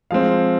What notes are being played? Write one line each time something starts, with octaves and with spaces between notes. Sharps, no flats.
F3 G#3 C4 F5